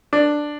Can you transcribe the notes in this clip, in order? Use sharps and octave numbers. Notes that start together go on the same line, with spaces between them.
D4